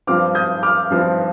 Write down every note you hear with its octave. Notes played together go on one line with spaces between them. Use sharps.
G2 F3 C4 D6 F6
D#6 G6
D6 F6
G2 F3 C4